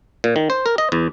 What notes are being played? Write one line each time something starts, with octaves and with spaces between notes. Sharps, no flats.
A#2
D#3
C5
A#4
D#5
E2